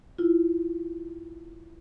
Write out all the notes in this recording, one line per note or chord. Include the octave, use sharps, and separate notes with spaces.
E4 F4